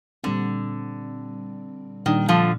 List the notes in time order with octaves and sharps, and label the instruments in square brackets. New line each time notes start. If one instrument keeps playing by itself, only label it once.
[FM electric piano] A#2 G3 C4 [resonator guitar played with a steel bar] D3
[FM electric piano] A#2 G3 D4 [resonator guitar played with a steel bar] D#3
[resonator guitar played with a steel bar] D3 F3